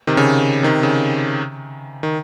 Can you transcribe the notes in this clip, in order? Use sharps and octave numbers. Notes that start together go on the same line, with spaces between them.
C3 D#3
C#3
C3 D#3
C#3
D#3